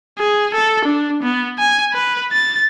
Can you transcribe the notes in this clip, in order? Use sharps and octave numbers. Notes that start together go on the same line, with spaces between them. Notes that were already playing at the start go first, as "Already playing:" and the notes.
G#4
A4
D4
B3
G#5
B4
A6